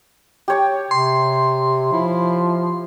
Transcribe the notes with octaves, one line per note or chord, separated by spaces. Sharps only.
G4 C#5 A5
C3 C6
F3 E4